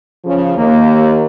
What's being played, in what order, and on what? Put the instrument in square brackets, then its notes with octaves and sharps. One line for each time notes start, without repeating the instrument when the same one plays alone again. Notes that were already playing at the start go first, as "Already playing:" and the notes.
[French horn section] C#3 F3
[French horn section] D#2 [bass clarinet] A#3